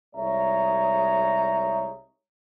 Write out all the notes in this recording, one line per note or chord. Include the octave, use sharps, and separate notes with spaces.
C2 G#3 D#4 C#5 E5 A#5